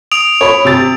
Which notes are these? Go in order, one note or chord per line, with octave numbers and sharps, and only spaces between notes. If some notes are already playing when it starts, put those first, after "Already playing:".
D#6 D7 F7
C#5 B5
C3 A6